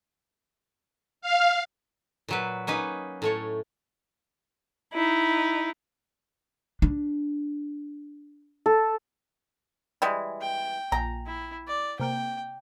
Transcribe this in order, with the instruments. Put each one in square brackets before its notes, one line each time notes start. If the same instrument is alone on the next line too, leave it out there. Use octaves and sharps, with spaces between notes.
[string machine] F5
[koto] A#2 F#3 B4
A#3 C#4 D#4 B4
A2 A3 C#5
[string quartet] D#4 E4
[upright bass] D4
[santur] A4
[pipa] E3 G3 G#3
[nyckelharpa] G5
[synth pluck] A#1 G#5 [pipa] A#5
[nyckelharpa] E4
D5
[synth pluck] C3 A#3 [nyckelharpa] G5